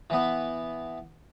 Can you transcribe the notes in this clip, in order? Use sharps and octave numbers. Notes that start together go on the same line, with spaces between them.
E3 B3